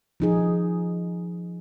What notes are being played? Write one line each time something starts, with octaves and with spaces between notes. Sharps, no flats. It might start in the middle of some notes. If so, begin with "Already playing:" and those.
F3 D#4 G#4